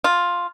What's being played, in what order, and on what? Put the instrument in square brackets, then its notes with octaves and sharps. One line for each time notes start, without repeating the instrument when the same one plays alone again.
[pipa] F4